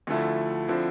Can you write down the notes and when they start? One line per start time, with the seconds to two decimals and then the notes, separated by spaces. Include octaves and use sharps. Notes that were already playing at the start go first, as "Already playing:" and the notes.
0.07 D2 D3 F3 A3 E4
0.68 D3 F3 C4 E4